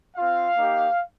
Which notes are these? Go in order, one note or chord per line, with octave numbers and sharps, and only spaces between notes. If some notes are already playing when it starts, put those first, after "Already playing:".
C4 F4 F5
A#3 D#4 G4